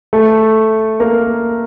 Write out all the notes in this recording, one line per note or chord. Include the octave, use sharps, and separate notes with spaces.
A3 A4
A#3 A#4